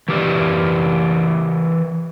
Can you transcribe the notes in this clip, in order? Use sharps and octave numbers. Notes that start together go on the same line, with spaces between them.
E3 G4 A#4 D5